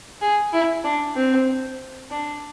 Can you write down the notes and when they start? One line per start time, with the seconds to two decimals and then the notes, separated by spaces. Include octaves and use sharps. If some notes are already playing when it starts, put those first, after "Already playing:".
0.21 G#4
0.53 E4
0.84 D4
1.16 C4
2.10 D4